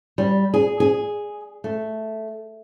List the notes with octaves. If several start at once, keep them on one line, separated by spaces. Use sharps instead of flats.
G3
G#4
G#4
A3